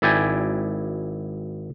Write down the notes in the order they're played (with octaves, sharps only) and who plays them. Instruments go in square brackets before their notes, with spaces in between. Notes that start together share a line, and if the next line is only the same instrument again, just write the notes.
[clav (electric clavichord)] G#1 E4 D5 G5 G#5